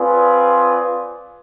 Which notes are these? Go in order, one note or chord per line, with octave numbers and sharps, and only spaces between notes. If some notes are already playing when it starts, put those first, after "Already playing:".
Already playing: C4 F4 G#4 B4 D5